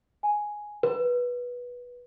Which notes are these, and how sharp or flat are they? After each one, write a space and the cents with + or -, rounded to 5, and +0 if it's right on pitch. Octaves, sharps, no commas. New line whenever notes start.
G#5 +5
B4 -15